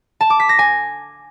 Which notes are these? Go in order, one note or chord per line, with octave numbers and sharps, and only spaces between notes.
A5
D6
B6
A#6
G#5